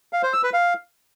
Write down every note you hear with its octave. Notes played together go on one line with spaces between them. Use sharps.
F5
C5
E6
B4
F5